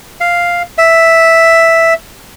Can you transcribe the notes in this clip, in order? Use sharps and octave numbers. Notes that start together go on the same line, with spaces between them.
F5
E5